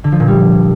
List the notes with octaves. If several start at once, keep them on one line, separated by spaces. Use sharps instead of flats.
D3
F3
A#2
G3